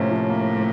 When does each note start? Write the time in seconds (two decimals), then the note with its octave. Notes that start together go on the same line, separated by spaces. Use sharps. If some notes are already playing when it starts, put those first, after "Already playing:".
Already playing: A2 C3 F3 A#3 C#4
0.11 F3
0.29 A#3